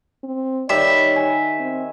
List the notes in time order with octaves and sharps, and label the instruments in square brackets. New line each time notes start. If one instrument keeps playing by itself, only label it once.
[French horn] C4
[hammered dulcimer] D#3 G3 [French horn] C#5 [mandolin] E5
[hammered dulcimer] G#5
[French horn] C4